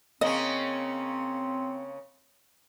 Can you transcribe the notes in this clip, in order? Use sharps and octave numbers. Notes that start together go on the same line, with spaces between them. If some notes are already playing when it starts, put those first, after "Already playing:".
C#3 A#3 C4 C#4 D#5